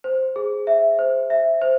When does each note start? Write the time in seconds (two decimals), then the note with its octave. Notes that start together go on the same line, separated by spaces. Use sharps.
0.04 C5
0.36 G#4
0.67 E5
0.99 C5
1.30 E5
1.62 C5